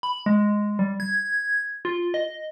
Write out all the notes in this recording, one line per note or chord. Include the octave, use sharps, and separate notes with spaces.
B5
G#3
G3
G#6
F4
D#5